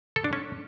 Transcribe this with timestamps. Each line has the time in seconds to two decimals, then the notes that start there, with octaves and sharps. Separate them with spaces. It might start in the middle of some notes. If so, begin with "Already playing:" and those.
0.16 A4
0.24 D4
0.33 C#4